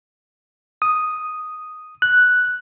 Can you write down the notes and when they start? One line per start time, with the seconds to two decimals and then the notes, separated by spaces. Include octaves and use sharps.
0.82 D#6
2.02 F#6